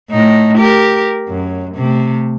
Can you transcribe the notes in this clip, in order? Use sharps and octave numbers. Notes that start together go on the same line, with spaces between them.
A2 D#4
G4 A#4
F#2
C3 A3